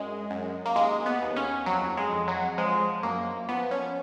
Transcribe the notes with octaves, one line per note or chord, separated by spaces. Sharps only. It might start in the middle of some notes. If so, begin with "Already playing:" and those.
Already playing: F#2 G#3
F#2
A#3
D#2 G#3
B3
D#2
C#4
F2 F#3
G#3
F2
F#3
F3 G#3
F#2 A#3
F3 B3
C#4